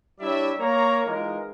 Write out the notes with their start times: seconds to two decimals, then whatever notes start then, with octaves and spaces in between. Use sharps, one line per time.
0.20 G3 D4 E4 C#5 D5 E5
0.60 A#3 C#5 A#5
1.06 E3 G#3 D#4 F4 A#4